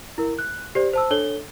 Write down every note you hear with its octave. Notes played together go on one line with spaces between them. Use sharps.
E4 A#4
F#6
G4 C5 D5
C5 A5 E6
D4 A4 C#5 G7